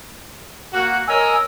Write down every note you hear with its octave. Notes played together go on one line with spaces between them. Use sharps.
A#3 F#4
A#4 C#5 D#5 G#5 E6